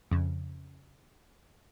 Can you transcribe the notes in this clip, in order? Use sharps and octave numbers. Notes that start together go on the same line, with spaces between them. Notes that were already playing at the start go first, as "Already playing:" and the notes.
F2 C#3